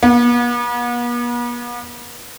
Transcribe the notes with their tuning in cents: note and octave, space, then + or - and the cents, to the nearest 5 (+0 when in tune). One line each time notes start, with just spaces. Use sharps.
B3 -45